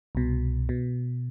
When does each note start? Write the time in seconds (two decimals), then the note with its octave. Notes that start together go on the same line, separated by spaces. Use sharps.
0.15 C2 B2
0.69 B2